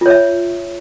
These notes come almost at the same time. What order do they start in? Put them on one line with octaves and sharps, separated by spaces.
F4 C#5 E5